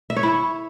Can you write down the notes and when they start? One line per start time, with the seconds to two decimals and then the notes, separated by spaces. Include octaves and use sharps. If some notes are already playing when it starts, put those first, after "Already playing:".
0.10 E5
0.16 C#5
0.23 E4